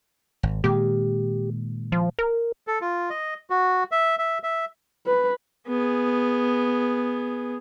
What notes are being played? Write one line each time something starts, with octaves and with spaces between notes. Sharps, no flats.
G#1
A#2 D#3 G#3 G4
F3
A#4
A4
F4
D#5
F#4
E5
E5
E5
B4
B3 G#4